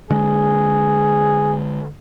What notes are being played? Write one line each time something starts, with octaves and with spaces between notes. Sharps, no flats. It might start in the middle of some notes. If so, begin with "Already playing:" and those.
D3 G#3 G#4